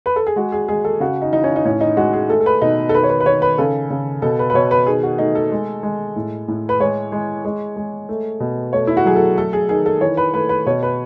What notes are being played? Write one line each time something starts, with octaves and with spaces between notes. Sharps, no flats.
B4
A4
G#4
G#3 F#4
G#4
G#3 G#4
A4
C#3 F#4
D#4
E3 D#4
C#4
D#4
A2 C#4
D#4
G#3 F#4
G#4
A3 A4
A4
B4
B2 D#4
A4
D#3 B4
C#5
B4
B4
D#3 C#5
B4
C#3 A4
C#3
B2 A4
B4
B4
B2 C#5
B4
D#3 G#4
F#4
A3 D#4
A4
G#3
G#3
A2
A2
B4
G#3 C#5
G#3
G#3
G#3
A3
B2
A3 C#5
E4
F#4
F#3 G#4
A4
A3 A4
G#4
D#3 G#4
A4
E3 C#5
B4
A3 B4
B4
B2 C#5
B4